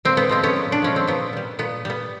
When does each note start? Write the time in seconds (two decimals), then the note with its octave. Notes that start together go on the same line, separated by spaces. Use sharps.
0.05 A#2 C4
0.17 B3
0.29 F3 G#3 C4
0.43 B3 C#4
0.56 A#2
0.72 D4
0.82 F3 G#3 C#4
0.96 C4
1.07 A#2 B3
1.33 G3 B3
1.59 A#2 B3
1.85 G3 B3